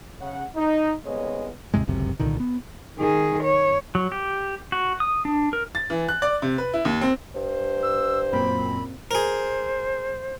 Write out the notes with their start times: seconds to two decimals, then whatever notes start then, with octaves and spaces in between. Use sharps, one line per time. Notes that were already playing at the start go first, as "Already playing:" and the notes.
0.19 C#3 F#5
0.56 D#4
1.04 C2 C#3 G#3 B3 C#5 D#5
1.74 D#2 G#2 C3 G#3
1.87 G1 C#2 F#2 C3
2.20 C2 A#2 D3 D#3
2.40 B3
2.99 D#3 G#4
3.44 C#5
3.95 F#3
4.12 G4
4.72 F#4
5.00 D#6
5.25 D4
5.53 A#4
5.75 A6
5.90 E3
6.09 F#6
6.22 D5
6.42 C3
6.58 B4
6.73 E4
6.85 D#2
7.01 C4
7.36 G2 C5
7.83 E6
8.33 F#2 A#2 C4 B5
9.11 G#4 A#4 C5